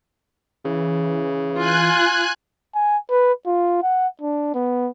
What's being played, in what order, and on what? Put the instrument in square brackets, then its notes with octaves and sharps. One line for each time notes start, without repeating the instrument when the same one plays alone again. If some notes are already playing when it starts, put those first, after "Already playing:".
[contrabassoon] C#3 [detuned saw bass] E3
[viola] F4 [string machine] G#5 F#6
[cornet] G#5
B4
F4
F#5
D4
B3